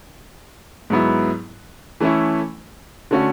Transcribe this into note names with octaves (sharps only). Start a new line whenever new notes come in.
G#2 F#3 B3 E4
E3 A3 C#4 E4
D3 A3 C#4 F#4